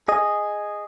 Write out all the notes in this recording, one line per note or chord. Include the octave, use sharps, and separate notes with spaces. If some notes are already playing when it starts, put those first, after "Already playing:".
G#4 D#5